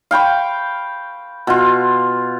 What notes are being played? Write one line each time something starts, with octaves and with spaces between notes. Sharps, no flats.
F5 G5 B5 C#6
B2 F4